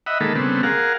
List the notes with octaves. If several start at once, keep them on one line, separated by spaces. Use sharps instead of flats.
D#5 E5 F#5 B5
D#3 G#3 A#3 A4 B5
C#3 G3 A3 B3 C4
G#4 A#4 F5 F#5